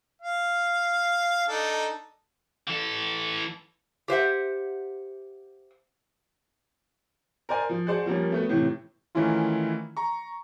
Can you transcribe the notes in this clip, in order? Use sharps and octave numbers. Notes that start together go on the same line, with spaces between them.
F5
D4 D#4 A4
E3 A4
G4 C5 E5 F#5
A#4 C5 D5 G#5
F3
F#4 G#4 C5 D5 A5
F3 G3 A#3 C#4
A3 B3 F#4
A2 C3 E3
D#3 E3 A3 C#4 E4 F4
A#5 C#6